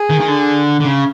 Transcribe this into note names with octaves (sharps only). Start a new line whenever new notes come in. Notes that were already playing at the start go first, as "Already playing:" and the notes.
Already playing: G#4
D#3
D#3
D3
D3
C#3